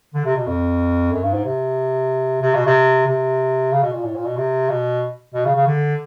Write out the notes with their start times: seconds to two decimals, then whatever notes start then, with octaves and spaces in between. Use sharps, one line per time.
0.14 D3
0.25 C3
0.36 B2
0.47 F2
1.12 F#2
1.23 G2
1.34 G#2
1.45 C3
2.42 C3
2.54 B2
2.66 C3
3.07 C3
3.72 C#3
3.83 B2
3.93 A#2
4.04 A2
4.15 A#2
4.26 B2
4.37 C3
4.69 B2
5.34 B2
5.45 C#3
5.55 C#3
5.67 D3